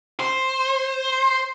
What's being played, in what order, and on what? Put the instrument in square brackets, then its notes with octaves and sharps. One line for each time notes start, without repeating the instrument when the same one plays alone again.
[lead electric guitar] C5